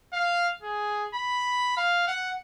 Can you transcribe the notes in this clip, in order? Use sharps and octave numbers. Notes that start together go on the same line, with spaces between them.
F5
G#4
B5
F5
F#5